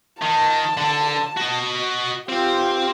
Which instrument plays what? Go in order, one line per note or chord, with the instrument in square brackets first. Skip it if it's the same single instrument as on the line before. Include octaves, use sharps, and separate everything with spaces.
[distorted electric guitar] D#3 [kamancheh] A5
[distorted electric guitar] D3
F#4 D#5
[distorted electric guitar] C4 [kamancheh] F4 G4